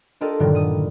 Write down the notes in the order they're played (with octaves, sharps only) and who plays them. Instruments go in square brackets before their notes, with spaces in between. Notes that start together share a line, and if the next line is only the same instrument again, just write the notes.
[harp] D4 F4 G4 A4 A#4 D#5
G2 A#2 D3 D#3 F#3 G3
D#6 D#7